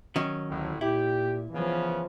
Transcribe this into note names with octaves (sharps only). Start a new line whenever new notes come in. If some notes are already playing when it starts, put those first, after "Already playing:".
D#3 F#3 C#4
A1 D2 A2
A#2 E4 G4
C#3 E3 F3 B3